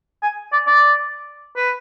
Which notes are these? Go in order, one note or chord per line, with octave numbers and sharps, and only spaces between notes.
G#5
D5
D5
B4